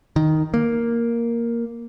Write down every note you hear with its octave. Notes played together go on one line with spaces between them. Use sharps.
D#3
A#3